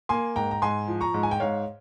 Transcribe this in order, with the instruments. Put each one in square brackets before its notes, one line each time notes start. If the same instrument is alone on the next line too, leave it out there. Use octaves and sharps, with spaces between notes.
[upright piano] A#3 G#5 C6
G#2 G5 A#5
A#5
G#2 G#5 C6
F3
A#5 C#6
G#2
G#5
G5
G#2 C#5 F5